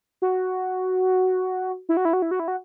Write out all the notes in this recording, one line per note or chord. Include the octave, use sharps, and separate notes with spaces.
F#4
E4
F#4
E4
F#4
E4
F#4
E4
F#4